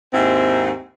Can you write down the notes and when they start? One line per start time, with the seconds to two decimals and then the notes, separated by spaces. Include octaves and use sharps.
0.12 D#2 G#2 C4 E4